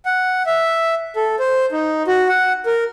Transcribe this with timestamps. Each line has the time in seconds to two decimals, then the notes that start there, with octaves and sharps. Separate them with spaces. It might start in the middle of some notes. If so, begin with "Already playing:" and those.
0.05 F#5
0.46 E5
1.16 A4
1.39 C5
1.72 D#4
2.07 F#4
2.28 F#5
2.66 A#4